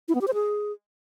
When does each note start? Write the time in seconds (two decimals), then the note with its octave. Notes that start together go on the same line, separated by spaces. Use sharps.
0.08 E4
0.15 B3
0.21 G4
0.28 C5
0.34 G#4